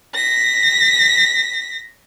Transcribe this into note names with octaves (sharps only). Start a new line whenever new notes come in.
A#6 B6